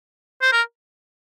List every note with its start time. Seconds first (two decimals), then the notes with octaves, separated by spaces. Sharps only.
0.42 C5
0.52 A#4